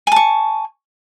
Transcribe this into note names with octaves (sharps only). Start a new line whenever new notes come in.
G#5 A5 C#6